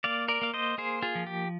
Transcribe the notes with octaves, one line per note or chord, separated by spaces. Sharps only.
A#3 D5 F5
A#4 D5
A#3 F5
C5 D#5
A#3 G#4 C5
F4 G#4
F3
G4